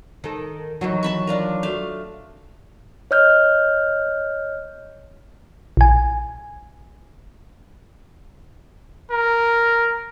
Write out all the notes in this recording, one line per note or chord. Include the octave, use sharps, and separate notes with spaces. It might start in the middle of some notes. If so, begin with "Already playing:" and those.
D#3 A4
D#3 E3 F#3 F#4
A5 B5 C#6
D4 F4 A#4
A3 F5
C#5 D#5 F6 G6
A#1 G#5
A#4